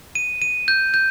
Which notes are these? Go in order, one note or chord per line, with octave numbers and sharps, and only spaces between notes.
D#7
D#7
G6
G6